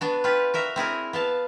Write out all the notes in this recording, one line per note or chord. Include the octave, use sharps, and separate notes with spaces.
B3 D4 F#4
F4 G4 B4
F#4 A#4 E5
C4 E4 G#4 A#4
B3 F5 A5